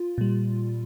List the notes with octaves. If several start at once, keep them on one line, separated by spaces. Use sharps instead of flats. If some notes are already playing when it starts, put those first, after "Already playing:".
Already playing: F4
A#2 G3